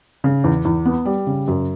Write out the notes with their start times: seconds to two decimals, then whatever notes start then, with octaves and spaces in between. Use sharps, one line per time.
0.24 C#3
0.44 E2
0.65 E2
0.85 B3
1.06 G3
1.27 C#3
1.48 F#2